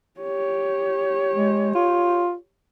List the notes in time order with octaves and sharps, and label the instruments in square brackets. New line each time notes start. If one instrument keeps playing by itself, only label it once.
[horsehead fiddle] G4 C#5
[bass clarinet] G#3
F4